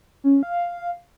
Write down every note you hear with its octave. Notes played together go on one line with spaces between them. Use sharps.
C#4
F5